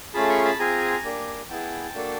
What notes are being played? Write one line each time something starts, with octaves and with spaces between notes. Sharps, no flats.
A3 C#4 F4 G#4 A5 B5
B5 C#6
A5 B5
C4 F4 G#4 G#5 A#5
A#3 D4 G4
B3 E4 G#4 G5 A5
A#3 D4 F#4 A4